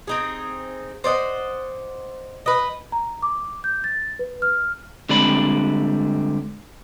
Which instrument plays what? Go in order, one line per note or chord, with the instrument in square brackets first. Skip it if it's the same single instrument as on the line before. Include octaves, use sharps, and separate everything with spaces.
[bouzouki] C4 D#4 G#4
C5 D5 D#5 F#5
B4 D#5
[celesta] A#5
D6
G6
A6
B4
F6
[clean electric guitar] D3 G3 G#3 C4 D5 B5